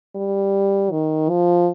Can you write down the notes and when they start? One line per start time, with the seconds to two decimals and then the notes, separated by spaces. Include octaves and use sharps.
0.15 G3
0.91 D#3
1.29 F3